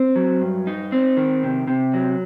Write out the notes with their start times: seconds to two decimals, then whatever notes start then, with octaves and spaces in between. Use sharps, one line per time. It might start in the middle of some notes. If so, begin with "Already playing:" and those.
Already playing: C4
0.16 F#3
0.41 G2
0.67 D#4
0.92 C4
1.17 D#3
1.43 C3
1.67 C3
1.94 F#3